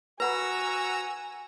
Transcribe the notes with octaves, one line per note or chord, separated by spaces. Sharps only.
F#4 B4 F#5 G#5 A#5 B5 E6